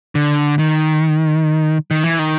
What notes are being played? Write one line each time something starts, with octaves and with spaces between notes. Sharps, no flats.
D3
D#3
D#3
E3
D#3